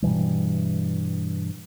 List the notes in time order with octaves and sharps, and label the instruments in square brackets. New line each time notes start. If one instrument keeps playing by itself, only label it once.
[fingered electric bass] G2 B2 E3 G3